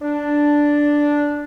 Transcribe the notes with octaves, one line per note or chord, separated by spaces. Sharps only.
D4